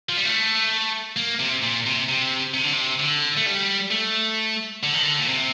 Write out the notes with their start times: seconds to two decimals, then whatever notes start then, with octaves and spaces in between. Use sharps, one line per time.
0.09 F3
0.17 G3
0.25 A3
1.16 A#3
1.39 C3
1.62 A#2
1.86 C3
2.09 C3
2.54 C3
2.64 D3
2.74 C3
2.99 D3
3.37 A3
3.46 G3
3.91 A3
4.83 D3
4.94 D#3
5.03 D3
5.19 A#2
5.29 C3